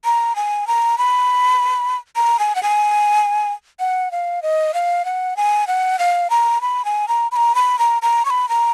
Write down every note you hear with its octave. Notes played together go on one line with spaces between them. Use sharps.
A#5
G#5
A#5
B5
A#5
G#5
F#5
G#5
F#5
F5
D#5
F5
F#5
G#5
F#5
F5
A#5
B5
G#5
A#5
B5
A#5
B5
A#5
A#5
C#6
B5
A#5